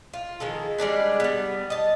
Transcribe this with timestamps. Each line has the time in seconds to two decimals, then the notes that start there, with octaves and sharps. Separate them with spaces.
0.14 F4
0.40 D#3 F3 G#3 A4
0.78 G3 G#3 D4 B4
1.20 G3 B3
1.70 D#5 A5